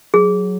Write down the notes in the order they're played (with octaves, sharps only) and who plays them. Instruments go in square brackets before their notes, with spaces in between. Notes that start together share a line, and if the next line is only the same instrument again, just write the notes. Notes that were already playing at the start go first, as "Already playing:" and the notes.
[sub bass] F#3 [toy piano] G#4